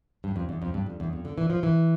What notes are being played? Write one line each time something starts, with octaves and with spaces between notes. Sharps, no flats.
G2
F2
E2
F2
G2
F2
E2
F2
D3
E3
F3
E3